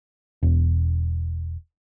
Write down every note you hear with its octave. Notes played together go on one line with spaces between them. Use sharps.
E1